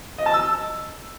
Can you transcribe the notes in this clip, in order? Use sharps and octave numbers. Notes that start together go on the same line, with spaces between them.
D#5
A5
E6